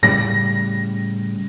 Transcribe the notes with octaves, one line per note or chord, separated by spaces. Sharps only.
A2 C#3 G3 A#6